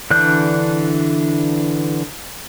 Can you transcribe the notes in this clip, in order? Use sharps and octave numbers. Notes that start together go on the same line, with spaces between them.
D3 E3 D4 F#6 G6